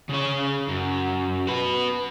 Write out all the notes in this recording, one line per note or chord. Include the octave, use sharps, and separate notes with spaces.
C#3 C#5
F#2
F#4 B4